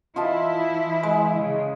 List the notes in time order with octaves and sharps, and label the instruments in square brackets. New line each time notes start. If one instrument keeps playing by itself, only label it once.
[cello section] E3 E4 [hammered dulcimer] F4 D#5 A5
[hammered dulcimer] G#3
[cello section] C#3